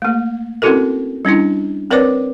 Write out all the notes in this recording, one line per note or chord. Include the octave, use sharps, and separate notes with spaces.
A3 A#3
C4 C#4 E4 F#4 A4 A#4
G3 C#4 D4 E4
C4 A#4 B4 C#5 D5 D6